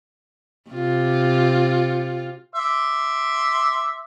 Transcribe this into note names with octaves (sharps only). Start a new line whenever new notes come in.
C3 F4
E5 C6 D6